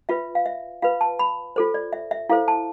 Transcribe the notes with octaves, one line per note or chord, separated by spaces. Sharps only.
F4 B4 E5
F5
E5
F4 B4 F5
A5
B5
F4 A4 C5
D5
E5
E5
E4 A4 C5 F5
A5